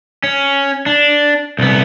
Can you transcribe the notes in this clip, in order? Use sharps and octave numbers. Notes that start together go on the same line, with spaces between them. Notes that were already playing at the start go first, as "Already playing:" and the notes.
C#4
D4
C2 B3